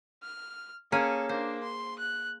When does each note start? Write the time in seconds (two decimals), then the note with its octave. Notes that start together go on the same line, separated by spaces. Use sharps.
0.23 F6
0.92 A#3 C#4 G#4 A4
1.29 A#3 D4 C5
1.63 C6
1.99 F#6